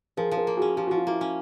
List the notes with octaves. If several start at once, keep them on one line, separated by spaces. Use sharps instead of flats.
F3 G#4 A#4
F3
G#4 A#4
A#3
C#4 F#4 G#4
F3 G4
F3 F#4
F4
A#3 E4 F#4
C#4